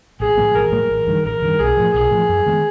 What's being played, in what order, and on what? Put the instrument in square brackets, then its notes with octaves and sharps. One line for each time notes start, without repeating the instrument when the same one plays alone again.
[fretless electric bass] A1 [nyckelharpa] G#4
[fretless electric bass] A2 F#3 A#3
[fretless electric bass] A1 [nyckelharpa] A#4
[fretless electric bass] A2 F#3 A#3
A1
G2 D#3
[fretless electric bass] A1 [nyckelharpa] A#4
[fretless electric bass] G2 D#3
[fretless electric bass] B1 [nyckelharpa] G#4
[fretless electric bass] A2 F3
[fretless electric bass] B1 [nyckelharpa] G#4
[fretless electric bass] A2 F3
F#2
D#3 G#3 B3